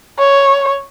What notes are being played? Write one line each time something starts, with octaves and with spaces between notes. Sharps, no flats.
C#5